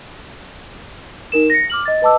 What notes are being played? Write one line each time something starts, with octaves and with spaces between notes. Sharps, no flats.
D#4 A#4 E7
A#6 C#7
D6 F6 F#7
D#5 A6
B4 D#5 A5 D6 E6